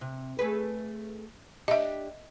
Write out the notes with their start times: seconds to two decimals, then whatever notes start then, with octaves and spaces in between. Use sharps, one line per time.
0.01 C3
0.39 A3 G#4 B4
1.68 D4 G4 D#5 E5